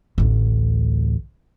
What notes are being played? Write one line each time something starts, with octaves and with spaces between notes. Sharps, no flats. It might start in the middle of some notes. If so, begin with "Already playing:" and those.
A1 D2